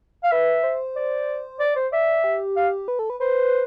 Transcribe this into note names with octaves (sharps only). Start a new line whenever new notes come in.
F5
B4 E5
C5
D5
D5
C5
D5 E5
G4
F5
B4
A4
B4
B4 C5